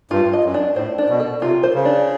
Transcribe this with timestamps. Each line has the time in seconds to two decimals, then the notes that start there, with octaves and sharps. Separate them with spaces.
0.11 G2 F4
0.33 D#5
0.44 F#2
0.54 D4
0.76 A2 C5
0.98 D4
1.09 B2
1.20 A4
1.42 C3 F4
1.63 C5
1.74 C#3
1.85 D4